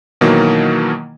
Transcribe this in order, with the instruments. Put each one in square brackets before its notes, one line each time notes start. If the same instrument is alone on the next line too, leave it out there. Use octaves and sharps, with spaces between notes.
[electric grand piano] B2 D#3 E3 F#3 A#3